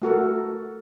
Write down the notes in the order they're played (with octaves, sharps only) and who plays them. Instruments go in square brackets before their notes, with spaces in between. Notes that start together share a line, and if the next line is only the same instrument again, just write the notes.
[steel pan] A3 F#4 A4 A#4